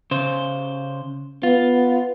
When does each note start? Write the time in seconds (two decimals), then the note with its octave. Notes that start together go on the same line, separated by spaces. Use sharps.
0.11 C#3 C5
1.43 B3 F4